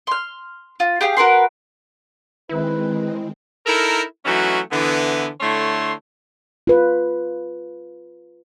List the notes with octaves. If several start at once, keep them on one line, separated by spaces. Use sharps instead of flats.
C6 F6
F4
G4 G#4 F5
F#4 A#4 B4 C6
D#3 G#3 C4 E4 B4
D#4 E4 A4 A#4
E3 F#3 A3 C#4 D#4 F#4
D3 E3 B3
D3 A3 E4 C#5 C6
F4 B4